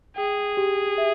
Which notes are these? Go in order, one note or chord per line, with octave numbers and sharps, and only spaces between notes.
G#4 G5
G4
E5